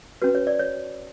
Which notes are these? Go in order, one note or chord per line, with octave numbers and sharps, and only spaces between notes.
C#4 F#4 B4
C#5
D5
C#5